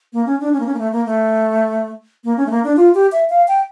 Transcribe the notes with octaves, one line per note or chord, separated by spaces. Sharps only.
A#3
C#4
D4
C#4
A#3
C#4
A#3
A3
A#3
A3
A#3
C#4
A3
A#3
D4
F4
G4
E5
F5
G5